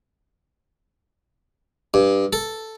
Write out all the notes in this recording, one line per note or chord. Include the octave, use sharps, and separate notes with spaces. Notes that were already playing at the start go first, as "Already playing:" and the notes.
G2
A4